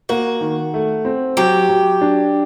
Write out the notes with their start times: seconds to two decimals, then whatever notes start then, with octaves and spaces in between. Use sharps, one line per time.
0.09 A#3 F#4
0.41 D#3
0.74 A3
1.05 C4
1.37 F#3 G4
1.69 F#3
2.01 D4